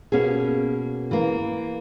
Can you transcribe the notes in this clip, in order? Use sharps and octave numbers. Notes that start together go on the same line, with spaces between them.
B2 A#3 C#4 G#4
E3 A#3